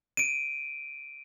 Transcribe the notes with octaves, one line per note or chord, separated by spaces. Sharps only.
D7 D#7